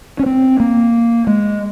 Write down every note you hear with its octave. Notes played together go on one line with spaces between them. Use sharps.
C#4
C4
A#3
G#3